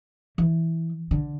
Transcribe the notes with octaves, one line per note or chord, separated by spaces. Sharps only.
E3
D3